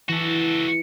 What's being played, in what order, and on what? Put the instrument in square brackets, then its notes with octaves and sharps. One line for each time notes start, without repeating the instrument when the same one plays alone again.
[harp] E3 [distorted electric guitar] F#4 A4